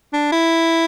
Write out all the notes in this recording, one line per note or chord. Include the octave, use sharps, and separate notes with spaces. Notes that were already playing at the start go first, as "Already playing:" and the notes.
D4
E4